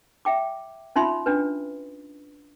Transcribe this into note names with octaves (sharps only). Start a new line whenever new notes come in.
E5 G5 D6
C#4 D#4 F4 E5 B5 C6
C#4 D4 B4